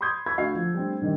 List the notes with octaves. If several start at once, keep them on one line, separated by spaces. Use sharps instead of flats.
B5 C6 D#6 G6 G#6
B5 C#6 E6 G#6
D2 F#4 F5 C7
F3
G3 A3 C4 D4
G2 D#3 G3